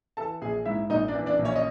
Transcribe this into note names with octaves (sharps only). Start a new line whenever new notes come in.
E3 A4 A5
A#1 G#4 G#5
G#2 E4 E5
A#1 D#4 D#5
D4 D5
E3
D4 D5
A#1
C#4 C#5
D#5